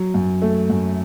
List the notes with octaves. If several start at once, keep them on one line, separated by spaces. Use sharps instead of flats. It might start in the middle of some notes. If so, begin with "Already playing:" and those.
Already playing: F#3
F#2
A3
F#2